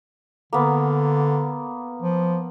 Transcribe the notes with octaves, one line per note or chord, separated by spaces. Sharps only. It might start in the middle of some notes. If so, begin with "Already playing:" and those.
D3 A#3 B3
F3